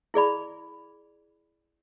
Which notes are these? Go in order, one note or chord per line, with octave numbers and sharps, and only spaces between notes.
E4 G#4 D5 B5